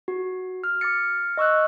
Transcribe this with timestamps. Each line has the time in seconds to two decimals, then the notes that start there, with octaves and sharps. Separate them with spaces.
0.08 F#4
0.64 F6
0.81 D6 F6 A6 C#7
1.37 D#5 C#6 E6 F#6